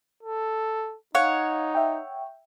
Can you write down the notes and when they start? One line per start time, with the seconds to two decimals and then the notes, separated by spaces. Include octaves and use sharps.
0.23 A4
1.15 D#4 C#5 F5 F#5
1.75 E5 G5